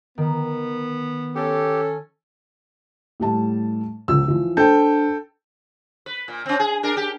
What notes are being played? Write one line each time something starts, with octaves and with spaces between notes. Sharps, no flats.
D#3 B3
C#4 G4 A4
A2 G3 A5
C#2 F3 E6
E3 F3
D4 A4 C5 G5 G6
B4
A#2
C4 C#4
G#4
D4 A#4
G4